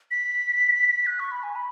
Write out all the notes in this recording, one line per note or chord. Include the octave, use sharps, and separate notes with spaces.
B6
F#6
C#6
B5
G#5
B5